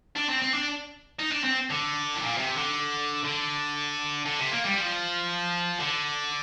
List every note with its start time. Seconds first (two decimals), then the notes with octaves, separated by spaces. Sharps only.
0.16 D4
0.29 C4
0.42 C4
0.54 D4
1.19 D#4
1.32 D4
1.44 C4
1.70 D3
2.15 A2
2.21 A#2
2.38 C3
2.56 D3
3.24 D3
4.25 D3
4.39 C3
4.51 A#3
4.65 G3
4.77 F3
5.80 D3